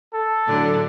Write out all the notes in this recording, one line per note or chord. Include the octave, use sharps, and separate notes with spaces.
A4
A2 D3 F#3